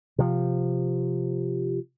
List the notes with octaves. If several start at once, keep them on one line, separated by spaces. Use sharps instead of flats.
C3 F3